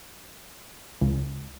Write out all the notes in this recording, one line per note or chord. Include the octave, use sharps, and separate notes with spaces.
C#2